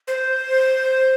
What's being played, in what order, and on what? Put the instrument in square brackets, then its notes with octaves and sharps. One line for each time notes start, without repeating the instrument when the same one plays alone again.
[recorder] C5